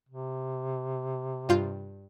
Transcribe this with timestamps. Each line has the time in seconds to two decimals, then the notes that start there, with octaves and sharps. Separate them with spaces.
0.09 C3
1.49 G2 F4 G6